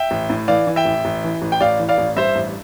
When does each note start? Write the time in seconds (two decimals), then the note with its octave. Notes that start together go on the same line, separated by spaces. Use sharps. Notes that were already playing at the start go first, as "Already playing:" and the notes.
Already playing: E5 G5
0.11 A1
0.30 A2
0.48 E3 D5 F5
0.67 E3
0.76 E5 G5
0.85 A1
1.05 A1
1.24 E3
1.42 A1
1.52 G5
1.61 A1 D5 F5
1.79 E3
1.89 D5 F5
1.98 A1
2.17 G2 C5 E5
2.36 A1